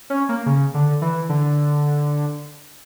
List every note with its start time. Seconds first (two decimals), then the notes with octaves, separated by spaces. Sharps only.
0.10 C#4
0.29 A#3
0.46 C#3
0.74 D3
1.02 E3
1.29 D3